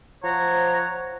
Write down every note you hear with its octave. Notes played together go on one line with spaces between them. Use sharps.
F3 C5 C#5 F#5 A#5